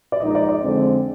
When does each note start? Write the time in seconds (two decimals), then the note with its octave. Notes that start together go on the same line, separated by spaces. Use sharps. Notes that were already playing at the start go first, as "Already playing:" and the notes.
0.12 D5
0.20 A#1 A#2 G#3 D#4 D#5
0.30 D#5
0.35 D5
0.49 D5
0.63 F2 D3 G#3 C4